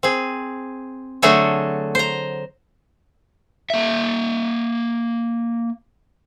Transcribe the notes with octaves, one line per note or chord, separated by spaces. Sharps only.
C4 G#4
D3 F#3 A3 F#4 G#4 A4
C5 A#5
A#3 E5